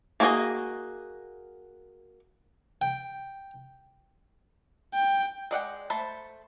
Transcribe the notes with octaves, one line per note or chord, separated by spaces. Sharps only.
A#3 D4 F#4 G#4 D#5
G5
G5
G#3 D5 F#5 G5
A3 C5 A5 B5